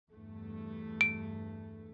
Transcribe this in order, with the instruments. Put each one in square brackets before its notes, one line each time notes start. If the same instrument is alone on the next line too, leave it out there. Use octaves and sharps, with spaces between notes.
[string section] E2 G2 A3
[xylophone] D7